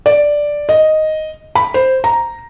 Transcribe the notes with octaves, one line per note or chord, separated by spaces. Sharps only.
D5
D#5
B5
C5
A#5